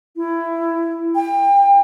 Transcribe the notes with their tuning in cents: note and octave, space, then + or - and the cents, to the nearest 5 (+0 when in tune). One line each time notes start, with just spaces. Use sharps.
E4 +15
G5 +30